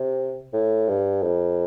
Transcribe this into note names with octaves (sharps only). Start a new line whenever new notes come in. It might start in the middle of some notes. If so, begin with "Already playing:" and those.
Already playing: C3
A2
G2
F2